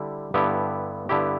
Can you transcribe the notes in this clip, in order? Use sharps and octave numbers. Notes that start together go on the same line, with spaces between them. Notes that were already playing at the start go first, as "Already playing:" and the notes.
Already playing: D3 G3 E4
G2 D3 B3 E4 G4
G2 D3 B3 E4 G4